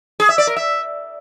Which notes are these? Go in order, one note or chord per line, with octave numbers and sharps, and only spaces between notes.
G#4
E5
D5
A#4
E5